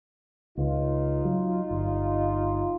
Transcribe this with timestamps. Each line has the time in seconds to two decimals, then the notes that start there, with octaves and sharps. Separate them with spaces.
0.57 C#2 D#4 F4
1.25 F#3
1.71 G1